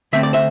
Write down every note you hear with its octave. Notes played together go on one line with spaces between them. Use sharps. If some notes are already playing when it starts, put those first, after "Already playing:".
D3 A3 C4 E5
D5
C5 E5